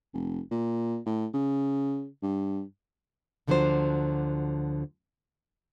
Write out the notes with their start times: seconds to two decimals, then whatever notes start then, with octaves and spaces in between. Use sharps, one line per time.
0.14 F1
0.51 A#2
1.06 A2
1.34 C#3
2.23 G2
3.47 D2 D3 F3 F#3 D4 C5